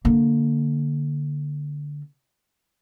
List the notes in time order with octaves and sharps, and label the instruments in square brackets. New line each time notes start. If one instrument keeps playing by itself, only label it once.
[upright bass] D3 A#3